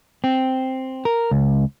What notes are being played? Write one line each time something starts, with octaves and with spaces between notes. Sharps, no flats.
C4
A#4
C#2